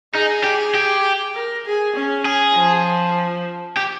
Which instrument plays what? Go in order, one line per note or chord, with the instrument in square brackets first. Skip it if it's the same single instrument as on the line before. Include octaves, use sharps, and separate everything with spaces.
[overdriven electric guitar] D#4 [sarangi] G#4
[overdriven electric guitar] G4
G4
[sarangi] A#4
G#4
C#4
[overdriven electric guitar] G#4
[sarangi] F3
[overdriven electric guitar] G4